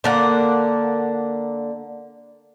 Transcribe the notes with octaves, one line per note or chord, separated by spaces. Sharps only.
D3 A#3 F#5